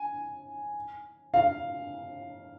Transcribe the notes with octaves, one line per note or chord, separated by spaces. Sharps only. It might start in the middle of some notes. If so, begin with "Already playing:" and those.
Already playing: G#5
F5